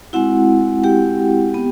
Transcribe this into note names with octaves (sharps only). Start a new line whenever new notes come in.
G#3 C4 E4 F#4 F#5
G4 G5
B3